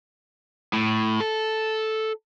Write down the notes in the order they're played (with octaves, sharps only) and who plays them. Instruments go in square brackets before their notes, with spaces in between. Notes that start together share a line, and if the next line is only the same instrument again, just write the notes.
[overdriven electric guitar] A2
A4